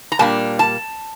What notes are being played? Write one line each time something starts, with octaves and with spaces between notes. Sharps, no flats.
A#5
A#2 G3 A#3 D4 A5
A5